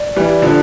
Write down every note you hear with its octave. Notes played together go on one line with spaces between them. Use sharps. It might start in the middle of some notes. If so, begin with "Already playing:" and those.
Already playing: D5
E3 G3
D3 F3